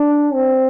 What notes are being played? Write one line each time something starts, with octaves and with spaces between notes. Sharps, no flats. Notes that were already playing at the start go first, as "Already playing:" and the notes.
Already playing: D4
C4